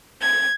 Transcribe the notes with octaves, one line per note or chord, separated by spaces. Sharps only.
G#6